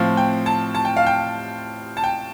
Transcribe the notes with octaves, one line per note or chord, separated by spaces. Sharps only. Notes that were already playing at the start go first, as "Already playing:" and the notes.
Already playing: A2 F3 C4 F5
G5
A5
A5
G5
F5
G5
A5
G5